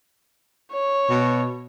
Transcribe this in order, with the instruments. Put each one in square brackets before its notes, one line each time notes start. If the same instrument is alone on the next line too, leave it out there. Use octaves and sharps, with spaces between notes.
[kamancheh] C#5
[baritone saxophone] B2